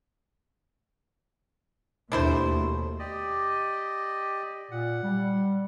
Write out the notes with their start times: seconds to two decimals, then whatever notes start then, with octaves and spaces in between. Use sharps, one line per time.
2.12 D#2 B2 A3 D4 E4 C5
2.99 G4 D5 D#5
4.71 A#2 F#5
5.03 G3